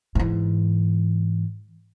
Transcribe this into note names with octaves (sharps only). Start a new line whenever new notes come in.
G#2 E3